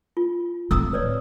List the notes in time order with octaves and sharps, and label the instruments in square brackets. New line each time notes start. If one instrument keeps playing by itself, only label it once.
[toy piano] F4
[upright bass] D1 C4 [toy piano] A#5 D#6 E6
[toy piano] B4 C#5 D5